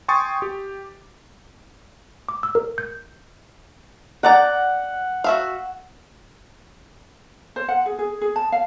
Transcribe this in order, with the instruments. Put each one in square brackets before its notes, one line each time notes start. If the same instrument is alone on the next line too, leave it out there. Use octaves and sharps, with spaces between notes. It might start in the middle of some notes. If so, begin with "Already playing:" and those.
[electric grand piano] G5 G#5 C6 C#6 D#6 A6
G4
[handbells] D6
E6
A#4
G6
[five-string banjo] D#4 D5 A#5 [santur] F#5
[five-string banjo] F#4 E5 F5
[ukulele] C5
F#5
G#4
G#4
G#4
A5
F5